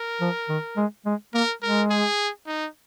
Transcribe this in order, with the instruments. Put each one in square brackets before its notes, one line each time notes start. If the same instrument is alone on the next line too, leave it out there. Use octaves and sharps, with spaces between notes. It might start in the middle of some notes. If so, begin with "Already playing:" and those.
Already playing: [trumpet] A#4
[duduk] F3
D#3
G#3
G#3
[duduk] A#3 [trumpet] A#4
[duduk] G#3 [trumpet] A#4
[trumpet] G#4
D#4